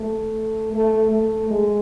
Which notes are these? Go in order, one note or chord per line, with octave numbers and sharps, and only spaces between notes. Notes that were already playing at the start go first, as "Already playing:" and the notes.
Already playing: A3
A3
A3
G#3